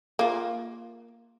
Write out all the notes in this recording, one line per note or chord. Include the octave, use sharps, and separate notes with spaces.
A#3 F4